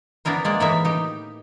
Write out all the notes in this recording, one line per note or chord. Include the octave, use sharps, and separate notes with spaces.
B3 D4 E4 A#4 C5
G#3 A#3 D5
A2 E3 A#3 D#4 A#4 E5
D#4 G4